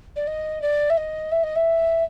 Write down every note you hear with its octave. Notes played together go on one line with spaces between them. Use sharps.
D5
D#5
D5
E5
D#5
E5
D#5
E5